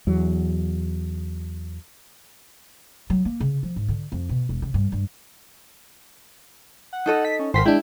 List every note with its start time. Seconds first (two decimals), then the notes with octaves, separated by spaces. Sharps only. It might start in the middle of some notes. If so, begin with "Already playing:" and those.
0.07 E2 F#3
3.10 F#3
3.25 A#3
3.40 C#3
3.63 F3
3.76 G#2
3.88 D3
4.12 F2
4.29 B2
4.49 E1
4.62 C#3
4.74 G2
4.92 G2
6.93 F#5
7.06 D#4 A4 D#5
7.25 B6
7.39 C#4
7.54 G#1 A#4 C5 C6 B6
7.66 G#3 D4 E4 G5